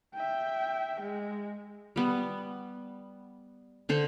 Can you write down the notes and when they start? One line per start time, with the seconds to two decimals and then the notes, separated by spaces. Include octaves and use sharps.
0.14 E5 G5
1.01 G#3
1.96 G3 B3
3.89 D3 A4 C5